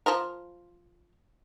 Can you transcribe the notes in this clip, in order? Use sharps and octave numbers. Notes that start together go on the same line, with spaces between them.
F3 F4 A#4